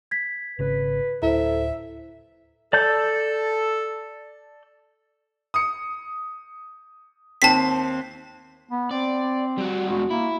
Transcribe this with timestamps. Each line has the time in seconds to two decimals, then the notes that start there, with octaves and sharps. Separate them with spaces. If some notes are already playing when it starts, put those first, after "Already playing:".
0.11 G#6 B6
0.59 G#1 C#3 B4
1.22 D1 E4 A4 C5 E5
2.73 A4 D5 A5 G6
5.54 D#6 C#7
7.42 D#2 C4 A5 B6 C7
8.71 B3
8.91 C4 D5
9.58 G3 F#4
9.88 E2 G#3 F#4
10.11 A#3 E4